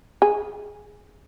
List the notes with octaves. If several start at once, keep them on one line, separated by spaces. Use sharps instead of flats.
G#4